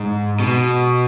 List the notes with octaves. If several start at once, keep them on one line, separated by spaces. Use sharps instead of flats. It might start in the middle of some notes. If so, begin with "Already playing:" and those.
Already playing: G#2
B2